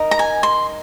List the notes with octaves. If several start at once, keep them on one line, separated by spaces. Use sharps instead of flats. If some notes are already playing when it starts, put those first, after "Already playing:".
Already playing: D#4 A#4 D#5
A#5
G#5
C6